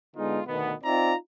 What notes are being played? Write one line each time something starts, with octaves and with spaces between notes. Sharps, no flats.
D3 G#3 B3 D#4 F4
D2 B2 D#3 B3
C4 D#4 F4 D5 E5 A#5